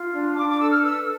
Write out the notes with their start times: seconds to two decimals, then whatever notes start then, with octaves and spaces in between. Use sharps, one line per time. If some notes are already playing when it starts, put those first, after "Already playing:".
Already playing: F4
0.13 D4
0.36 D4 D6
0.47 D6
0.59 A4 E6
0.70 F6
0.81 B4 E6